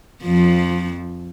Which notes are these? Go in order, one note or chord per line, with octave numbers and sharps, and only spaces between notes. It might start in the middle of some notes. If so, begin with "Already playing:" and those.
F2 F3